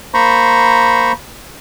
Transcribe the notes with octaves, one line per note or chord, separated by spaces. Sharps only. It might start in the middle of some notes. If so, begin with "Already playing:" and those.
A#3 C5 A#5 B5 C#6